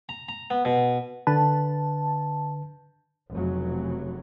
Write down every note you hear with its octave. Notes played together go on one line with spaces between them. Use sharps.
A#5
A#5
B3
B2
D3 B4 A5
F1 C#3 F#3